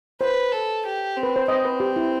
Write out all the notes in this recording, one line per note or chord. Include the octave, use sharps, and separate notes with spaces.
B4 C5
A4
G4
C4
B4
C5
C4 D#5
B4
G4
E4